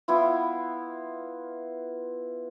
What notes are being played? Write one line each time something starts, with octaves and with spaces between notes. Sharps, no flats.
B3 E4 F4